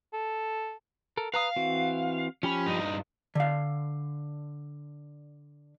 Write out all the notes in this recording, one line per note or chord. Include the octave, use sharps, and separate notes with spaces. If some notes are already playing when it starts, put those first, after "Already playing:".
A4
A4 A#4
B4 F5 A#5 D#6
E3 C4 F#4
F3 C#4 G4 B5
G2 D#4
D3 F5